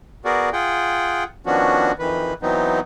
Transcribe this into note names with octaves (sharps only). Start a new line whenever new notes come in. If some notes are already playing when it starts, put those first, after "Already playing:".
B3 F#4 G#4 A#4 D5
F4 G#4 F#5 G5
D#3 F3 B3 C#4 D4 F#4
F2 D#3 E3 B4
E3 F#3 B3 C4 D#4